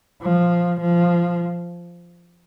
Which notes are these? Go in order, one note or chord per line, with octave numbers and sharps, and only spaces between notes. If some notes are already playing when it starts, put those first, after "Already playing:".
F3
F3